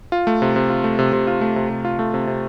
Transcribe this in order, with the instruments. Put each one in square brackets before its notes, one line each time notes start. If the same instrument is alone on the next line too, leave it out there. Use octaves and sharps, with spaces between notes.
[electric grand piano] F4
A3
C3
C3
F4
A3
C3
C3
F4
A3
C3
C3
F4
A3
C3
C3